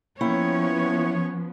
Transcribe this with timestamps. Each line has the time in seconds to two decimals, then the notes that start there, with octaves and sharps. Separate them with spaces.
0.21 F3 A#3 B3 C#4 E4 C#5 G5